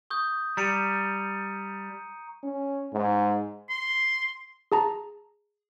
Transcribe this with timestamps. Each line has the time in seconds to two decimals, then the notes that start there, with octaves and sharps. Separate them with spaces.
0.10 C#6 D#6 G6
0.57 G3 A#5 C#7 D#7
2.43 C#4
2.93 G#2
3.70 C6
4.72 G#4 A5 A#5